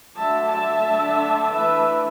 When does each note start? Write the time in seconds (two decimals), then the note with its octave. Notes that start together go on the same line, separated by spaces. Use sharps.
0.15 D3 F#3 A3 D4 E5 A5
0.50 E5 A5
0.84 D3 A3 D4
1.53 E3 A3 D4 B4 E5